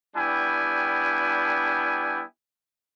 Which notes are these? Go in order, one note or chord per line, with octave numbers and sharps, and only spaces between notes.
G3 B3 D4 E4 G5 G#5